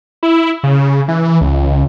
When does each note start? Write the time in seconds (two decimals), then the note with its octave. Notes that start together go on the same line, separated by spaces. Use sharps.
0.23 E4
0.64 C#3
1.08 E3
1.41 C#2